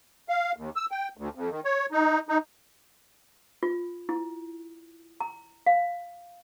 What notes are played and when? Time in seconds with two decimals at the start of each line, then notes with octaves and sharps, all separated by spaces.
0.29 F5
0.56 D#2
0.76 E6
0.91 G5
1.17 D2
1.35 F2
1.50 D#3
1.65 C#5
1.92 D#4
2.29 D#4
3.63 F4
4.09 E4
5.21 A#5
5.67 F5